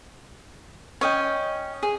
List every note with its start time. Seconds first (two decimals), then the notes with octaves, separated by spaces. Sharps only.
1.01 C#4 C#5 D#5 G5
1.83 G#4